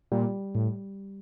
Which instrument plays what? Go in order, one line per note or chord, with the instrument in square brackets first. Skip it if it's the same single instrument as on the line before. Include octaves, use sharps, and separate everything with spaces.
[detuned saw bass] A#2 [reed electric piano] G3
[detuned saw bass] A2